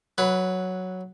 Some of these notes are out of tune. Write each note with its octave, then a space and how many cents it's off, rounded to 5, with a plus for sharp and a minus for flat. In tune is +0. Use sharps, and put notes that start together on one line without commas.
F#3 +0 B4 -10 B5 +25